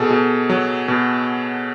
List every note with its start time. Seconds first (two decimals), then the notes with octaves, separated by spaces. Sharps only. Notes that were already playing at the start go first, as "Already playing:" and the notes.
Already playing: B2 G#4 A4
0.10 B2
0.49 F#3
0.88 B2